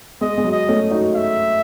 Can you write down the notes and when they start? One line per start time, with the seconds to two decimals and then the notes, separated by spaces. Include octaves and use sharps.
0.21 G#3 D#5
0.38 G#3
0.44 F#3
0.52 D#5
0.68 A3 C#4
0.91 D#4 F#4
1.15 E5